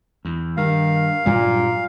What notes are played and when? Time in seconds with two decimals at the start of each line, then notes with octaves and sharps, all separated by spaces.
0.25 E2
0.57 G2 D#3 F5
1.26 G2 A#2 F#3 G3